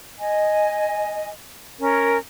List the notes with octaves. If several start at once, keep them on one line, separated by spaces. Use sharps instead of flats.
D#5 G#5
C#4 A#4